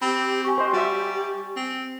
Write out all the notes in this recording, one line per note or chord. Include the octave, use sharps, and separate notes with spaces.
C4 G4 B5
G4 G#5 C#6
C5 D#5
G3 F#4 E5
C4